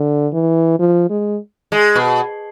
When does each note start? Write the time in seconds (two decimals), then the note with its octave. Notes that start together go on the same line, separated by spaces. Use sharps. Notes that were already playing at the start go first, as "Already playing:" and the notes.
Already playing: D3
0.33 E3
0.79 F3
1.10 G#3
1.72 G#3
1.95 B2